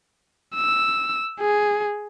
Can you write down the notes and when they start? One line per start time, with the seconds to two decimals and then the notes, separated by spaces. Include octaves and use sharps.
0.55 E6
1.41 G#4